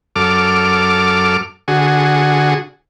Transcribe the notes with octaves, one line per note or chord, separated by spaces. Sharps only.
F#2 A4 D6 F6
D3 F#4 G#4